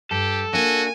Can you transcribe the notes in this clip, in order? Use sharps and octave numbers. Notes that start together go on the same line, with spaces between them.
G2 G4 A4
A#3 D4 F#4 G#5